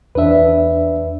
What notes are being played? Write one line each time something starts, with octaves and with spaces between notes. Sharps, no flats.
E2 D4 B4 E5